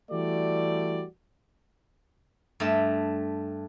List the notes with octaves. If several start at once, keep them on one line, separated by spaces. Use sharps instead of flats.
E3 G3 A3 F#4 D5
G2 A3 E5